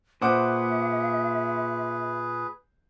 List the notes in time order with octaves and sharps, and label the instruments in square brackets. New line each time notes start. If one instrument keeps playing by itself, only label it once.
[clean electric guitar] A#2 [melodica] G#4 B4 [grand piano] C5 F#5 D6 [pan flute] E5